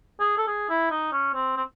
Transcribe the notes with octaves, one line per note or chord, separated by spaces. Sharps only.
G#4
A4
G#4
E4
D#4
C#4
C4
C4